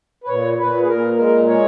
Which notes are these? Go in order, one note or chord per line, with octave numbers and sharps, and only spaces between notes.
B4
A#2 C#5
A#2 B4
G#4
A#2 A#4
G#3 A#4
G#3 C#5